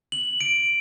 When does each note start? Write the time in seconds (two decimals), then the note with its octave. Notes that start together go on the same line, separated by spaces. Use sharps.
0.12 F#7
0.41 D7